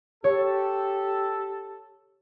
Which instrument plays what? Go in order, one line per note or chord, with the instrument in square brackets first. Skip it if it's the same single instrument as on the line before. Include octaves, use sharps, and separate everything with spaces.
[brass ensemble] G4 A4 [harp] C#5